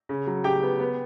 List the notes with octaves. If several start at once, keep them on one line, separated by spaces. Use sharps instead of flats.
C#3
F#3
C#3 G4 G5
B3
B3